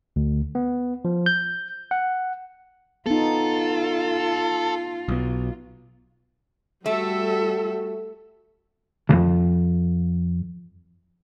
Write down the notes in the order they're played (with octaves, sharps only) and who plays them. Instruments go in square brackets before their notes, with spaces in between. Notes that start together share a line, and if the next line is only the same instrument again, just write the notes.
[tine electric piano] D2
B3
F3
G6
F#5
[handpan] B3 D#4 [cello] F4 [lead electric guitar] A4
[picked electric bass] B1 B2
[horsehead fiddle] G3 F#4 [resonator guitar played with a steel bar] A3 [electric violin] A4 E5
[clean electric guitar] C2 F2